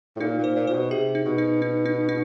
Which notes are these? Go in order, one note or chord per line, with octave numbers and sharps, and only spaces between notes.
A2
A#2 D#4
A#2
C5
A#2
A#2 C5
B2
C3 G#4
D#4
B2
D#4
D#4
D#4
D#4